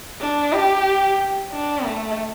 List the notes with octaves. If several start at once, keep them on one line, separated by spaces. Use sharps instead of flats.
D4
G4
D4
A3